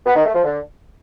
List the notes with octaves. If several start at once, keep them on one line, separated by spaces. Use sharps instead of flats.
B3
D#3
A3
F3
D3